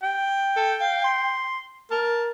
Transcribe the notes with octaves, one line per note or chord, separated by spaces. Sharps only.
G5
A4
F5
C6
A#4 A5